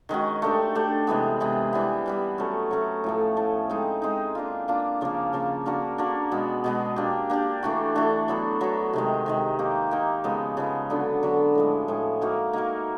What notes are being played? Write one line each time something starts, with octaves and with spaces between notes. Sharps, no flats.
D#3 G#3 C#4 F#4
A3 D4 G4 C5
A3 D4 G4 C5
C3 E3 G#3 B3
C3 E3 G#3 B3
E3 G3 B3
E3 G3 B3
F#3 A3 C#4
F#3 A3 C#4
A2 F3 A3
A2 F3 A3
G#3 C4 D#4
G#3 C4 D#4
A#3 D4 F4
A#3 D4 F4
C#3 F3 A#3
C#3 F3 A#3
A#3 D4 F#4 A#4
A#3 D4 F#4 A#4
B2 G#3 B3
B2 G#3 B3
A#3 D4 G4
A#3 D4 G4
E3 A3 D4 F#4
E3 A3 D4 F#4
F#3 B3 E4 A4
F#3 B3 E4 A4
C3 D#3 G#3
C3 D#3 G#3
A#3 D#4 G4
A#3 D#4 G4
C#3 F3 G#3 B3
C#3 F3 G#3 B3
D3 F#3 B3 D4
D3 F#3 B3 D4
A2 F3 G#3
A2 F3 G#3
A#3 D#4 F#4 A#4
A#3 D#4 F#4 A#4